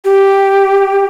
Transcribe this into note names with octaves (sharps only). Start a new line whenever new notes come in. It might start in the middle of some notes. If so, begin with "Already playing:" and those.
G4